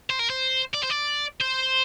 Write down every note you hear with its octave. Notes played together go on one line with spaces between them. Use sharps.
C5
A#4
C5
D5
C5
D5
C5